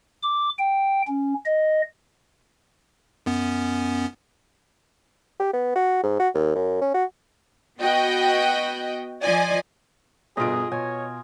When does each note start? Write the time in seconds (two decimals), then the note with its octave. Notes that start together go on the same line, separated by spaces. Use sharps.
0.23 D6
0.58 G5
1.08 C#4
1.45 D#5
3.26 F#2 B3 C#4
5.40 G4
5.53 B3
5.76 F#4
6.03 G#2
6.19 F#4
6.34 D#2
6.55 F#2
6.81 C#4
6.94 F#4
7.80 B3 F#4 D#5 G5
9.21 F3 D5 D#5 G#5
10.37 G1 B2 F4 G#4 D#5 D7
10.72 B2 C#5 G#5